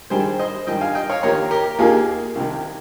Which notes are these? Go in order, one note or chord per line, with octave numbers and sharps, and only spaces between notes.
G2 D#3 G3 G#4 C5
C5 D#5
G2 D#3 G3 D#5 G5
F5 G#5
D#5 G5
C#5 F5
D#2 D#3 A#3 A#4 C#5
G4 A#4
D#2 D#3 A#3 F4 G#4
C2 C3 D#3